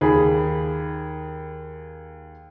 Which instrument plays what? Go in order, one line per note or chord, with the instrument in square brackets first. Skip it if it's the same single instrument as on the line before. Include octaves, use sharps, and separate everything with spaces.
[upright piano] D#2 G#4 B5